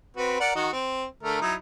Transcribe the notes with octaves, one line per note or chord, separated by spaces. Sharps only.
C4 F#4 B4
A#4 D5 F#5
D#3 F#4 D#5
C4
D3 A3 A#4
F#3 D#4 E4